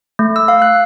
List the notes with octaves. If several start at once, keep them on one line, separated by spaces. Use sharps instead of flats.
A3
E6
F5
F#6